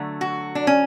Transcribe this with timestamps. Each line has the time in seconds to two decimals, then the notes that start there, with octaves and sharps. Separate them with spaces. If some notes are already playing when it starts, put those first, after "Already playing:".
Already playing: D3 F#3 A3
0.21 F#4
0.55 D4
0.67 C#4